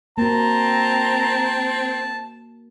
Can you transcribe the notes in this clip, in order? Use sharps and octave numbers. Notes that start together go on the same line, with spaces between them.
A#3 C4 F#4 A5 A#5